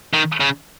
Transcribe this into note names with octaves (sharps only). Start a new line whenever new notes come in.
D#3
C#3